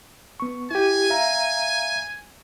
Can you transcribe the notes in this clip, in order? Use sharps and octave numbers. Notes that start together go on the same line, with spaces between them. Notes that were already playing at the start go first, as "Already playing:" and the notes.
B3 C#6
E4 G4 G#5
E5 F5 A#5